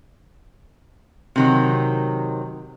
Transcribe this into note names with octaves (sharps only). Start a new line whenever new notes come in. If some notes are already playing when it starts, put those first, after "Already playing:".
C3 D#3 F#3